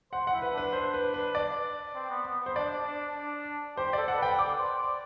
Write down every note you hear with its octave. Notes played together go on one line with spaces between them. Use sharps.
C5 F#5
F#5
E4
B4
D4 B4
C5
B4
B4
D5
C4
B3
B3
B3
C5
D4 D5
D4
D4
G4 C5
A4 D5
F#5
B4
G5
D5 D6
C5
D5